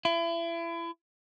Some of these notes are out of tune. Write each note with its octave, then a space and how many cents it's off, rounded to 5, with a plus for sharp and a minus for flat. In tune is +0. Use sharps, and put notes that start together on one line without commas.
E4 +35